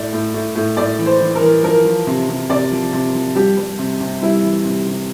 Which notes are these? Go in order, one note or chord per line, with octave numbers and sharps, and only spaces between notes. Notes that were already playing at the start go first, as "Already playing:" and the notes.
Already playing: A2 D5
A2
A2
A2
A2 D5
E3
C5
E3
A#4
E3
F3 A#4
F3
C3
C3
C3 D5
F3
C3
F3
G3 G4
G3
C3
C3
G3 E4
E3
C3
C3